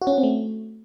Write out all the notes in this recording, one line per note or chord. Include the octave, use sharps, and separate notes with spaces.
F#4
C#4
F#4
C4
A3